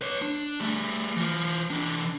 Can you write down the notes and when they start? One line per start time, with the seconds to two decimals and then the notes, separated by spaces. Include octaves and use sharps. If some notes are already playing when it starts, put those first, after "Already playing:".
0.02 B4 C#5
0.22 D4
0.60 G3 A3
1.16 E3 F4
1.70 E3 D4